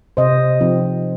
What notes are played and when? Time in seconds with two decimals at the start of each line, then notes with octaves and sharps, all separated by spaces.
0.17 C3 C5 D#5
0.61 F3 C4 D#4